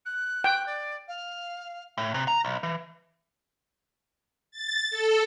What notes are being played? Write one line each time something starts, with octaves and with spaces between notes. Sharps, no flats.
F#6
G5
D5
F5
A2
C3
A#5
B1
E3
A6
A4